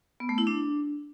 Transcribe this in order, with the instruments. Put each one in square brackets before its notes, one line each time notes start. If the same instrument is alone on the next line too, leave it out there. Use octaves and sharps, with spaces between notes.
[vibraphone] B3
A3
E4
D4